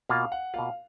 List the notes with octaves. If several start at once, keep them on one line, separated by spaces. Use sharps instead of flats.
B2 A#3 F4 F5
F#5
B2 A#3 F4 F5